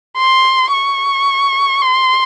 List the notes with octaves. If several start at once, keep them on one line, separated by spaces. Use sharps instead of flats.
C6
C#6
C6